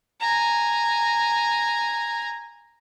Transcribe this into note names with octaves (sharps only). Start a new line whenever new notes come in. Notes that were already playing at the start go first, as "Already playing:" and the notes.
G#5 A#5